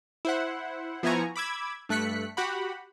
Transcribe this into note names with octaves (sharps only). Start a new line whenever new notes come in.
E4 C5 F#5
F3 B3 E4 G#5 A#5 C#6
B5 D6 E6 G#6
G2 A3 F#6 B6 C#7
F#4 G4 F#5 B5